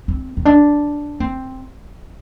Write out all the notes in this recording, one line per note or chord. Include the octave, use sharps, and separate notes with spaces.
C4
C4
D4
C4